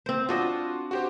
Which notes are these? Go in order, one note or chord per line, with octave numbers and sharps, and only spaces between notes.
C4 C5
C4 D4 F4 F#4 D#5
F#4 G4 C5